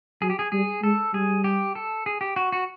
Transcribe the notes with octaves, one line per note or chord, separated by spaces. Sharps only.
F#3 G#4
G4
G#4
G3 G#4
G#3 A4
G3 G#4
G4
A4
G#4
G4
F#4
F#4